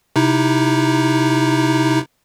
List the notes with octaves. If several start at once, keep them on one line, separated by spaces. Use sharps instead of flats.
C3 D#4 E4